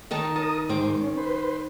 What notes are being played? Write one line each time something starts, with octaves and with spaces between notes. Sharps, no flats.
D#3 D#4 A5
A#4 A5 D#6
G#2 D#3 C5 D6
C#4
B4 C5